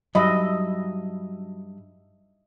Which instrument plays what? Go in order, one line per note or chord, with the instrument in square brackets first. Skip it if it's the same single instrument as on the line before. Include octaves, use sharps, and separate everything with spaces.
[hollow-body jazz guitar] G2 B5 [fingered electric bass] F#3 [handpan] D#5 E5